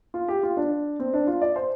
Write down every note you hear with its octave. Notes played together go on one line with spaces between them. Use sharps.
F4
G4
F4
D4
C4
D4
F4
D5
C5